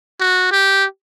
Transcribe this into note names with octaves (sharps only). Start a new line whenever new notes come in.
F#4
G4